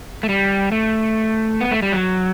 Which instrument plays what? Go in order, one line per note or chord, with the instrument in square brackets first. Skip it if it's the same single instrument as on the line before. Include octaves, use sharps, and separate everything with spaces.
[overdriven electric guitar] A3
G3
A3
B3
A3
G3
F#3